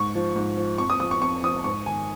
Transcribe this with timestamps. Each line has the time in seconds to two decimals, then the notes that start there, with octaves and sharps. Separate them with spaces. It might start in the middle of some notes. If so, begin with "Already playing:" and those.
Already playing: G#2 C#6
0.15 F3
0.36 G#2
0.57 F3
0.78 F2 C#6
0.90 D#6
1.00 F3 D#6
1.11 C#6
1.22 F2 C#6
1.44 F3 D#6
1.64 G#2 C#6
1.86 D#3 G#5